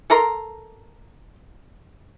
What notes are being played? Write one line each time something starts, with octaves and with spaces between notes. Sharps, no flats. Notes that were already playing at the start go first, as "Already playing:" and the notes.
A4 A#4 A#5 C6